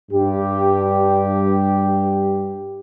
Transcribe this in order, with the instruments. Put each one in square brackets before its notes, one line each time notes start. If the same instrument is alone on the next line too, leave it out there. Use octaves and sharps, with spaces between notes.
[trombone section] G2 G4